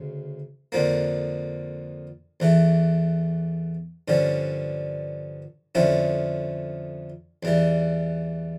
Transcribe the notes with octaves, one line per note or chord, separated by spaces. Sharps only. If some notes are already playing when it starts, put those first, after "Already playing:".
Already playing: D2 C#3
F2 D3 F3 A#3
E2 E3 A3
G2 D3 F3 C#4
F2 D3 F3 C#4 E4
E2 E3 G3